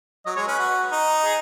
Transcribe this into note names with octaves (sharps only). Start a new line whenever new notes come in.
F#3 D#5
G#3 C#5
C#4 B4
F#4
D#4
G#4